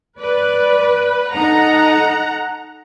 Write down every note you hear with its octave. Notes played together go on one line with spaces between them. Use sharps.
B4 D5
D#4 A4 F#5 A#5